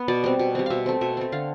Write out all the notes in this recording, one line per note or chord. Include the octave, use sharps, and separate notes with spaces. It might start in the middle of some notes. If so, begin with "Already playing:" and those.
Already playing: B3
B2 D5
G3 C4
B2
G3 C4
B2 E5 F5
A3 C4
B2 E5
A3 C4
D3 F5